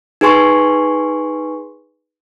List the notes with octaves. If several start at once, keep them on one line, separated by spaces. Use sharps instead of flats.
D#4 G#4 B4 G#5 C6 C#6